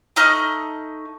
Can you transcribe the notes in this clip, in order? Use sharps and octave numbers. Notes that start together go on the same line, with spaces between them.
A3 D#4 D#5 F6